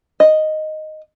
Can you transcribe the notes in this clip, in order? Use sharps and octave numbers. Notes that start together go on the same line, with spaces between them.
D#5